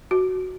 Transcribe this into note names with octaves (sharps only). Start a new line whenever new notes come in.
F#4